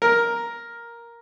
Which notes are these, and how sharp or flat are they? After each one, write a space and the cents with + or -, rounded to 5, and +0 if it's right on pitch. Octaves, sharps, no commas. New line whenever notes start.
A#4 +5